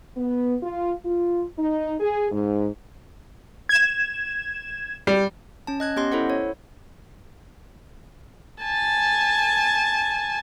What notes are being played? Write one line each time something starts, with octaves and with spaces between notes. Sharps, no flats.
B3
F4
F4
D#4
G#4
G#2
G#6 E7
G3
C#4 A5
D#5 F#6 G#6
B3 C#4 G4 D#5 C6
E4 A4 C5 F#5
C#5
G#5 A5